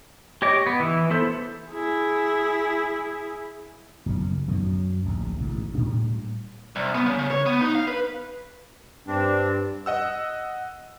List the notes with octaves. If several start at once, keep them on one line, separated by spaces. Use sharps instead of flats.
G4 C#5 D#5 D6
B3
E3
B3 E4 A4 C5
E4 G#4
F#1 B1 A#2
F#2 B2 D3 D#3
F#2 F3 F#3
D1 A#1
A1 G#2 B2
A2 G3 D4
C2
B3
C#3
C#3
C#5
B3
D#4
F5
B4
G2 C4 D4
D#5 F#5 E6